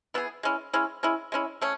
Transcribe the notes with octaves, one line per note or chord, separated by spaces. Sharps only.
E3 B3 E4 G#4
G#3 C#4 E4
G#3 C#4 E4
G#3 C#4 E4
G#3 C#4 E4
A3 C#4